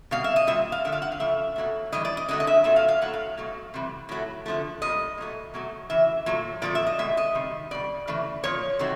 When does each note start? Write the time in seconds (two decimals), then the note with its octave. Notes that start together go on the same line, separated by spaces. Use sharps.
0.11 B2 G3 F5
0.24 E5
0.36 D#5
0.47 A#2 G3 E5
0.72 F5
0.85 D3 F3 A3 E5
0.92 F5
1.02 F#5
1.12 F5
1.20 C#3 F3 A3 E5
1.56 B2 F#3 A3
1.92 A2 E3 G3 D#5
2.05 D5
2.17 D#5
2.28 D3 F#3 A3 D#5
2.40 D#5
2.47 E5
2.64 A#2 F#3 A3 E5
2.76 F5
2.88 F5
3.01 A2 F#3 A3 F#5
3.14 F5
3.37 B2 F#3 A3
3.74 C3 E3 G3
4.09 A2 F#3 A3
4.46 D3 F3 A3
4.82 A#2 G3 D#5
5.18 A#2 F#3 A3
5.54 B2 F#3 A3
5.90 C#3 E3 E5
6.26 A#2 F#3 A3
6.62 A#2 F3 A3 D5
6.75 E5
6.86 D#5
6.98 B2 G#3 E5
7.17 D#5
7.35 C3 D#3 G3
7.71 B2 G3 D5
8.07 C#3 E3 A3
8.44 A#2 F3 C#5
8.79 C3 D#3 F#3 A3